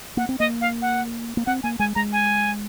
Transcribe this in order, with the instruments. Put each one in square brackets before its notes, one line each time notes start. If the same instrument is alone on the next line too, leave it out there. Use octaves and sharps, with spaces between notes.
[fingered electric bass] A#3 [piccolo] F#5
[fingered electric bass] C4
[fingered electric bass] A#3 [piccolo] D#5
[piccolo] F5
F#5
[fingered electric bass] A#3
[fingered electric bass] C4 [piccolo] F#5
[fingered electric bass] A#3 [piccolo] G#5
[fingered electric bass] G#3 [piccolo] G#5
[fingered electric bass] G#3 [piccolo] A#5
[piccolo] G#5